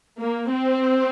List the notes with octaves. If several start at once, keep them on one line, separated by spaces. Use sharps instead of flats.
A#3
C4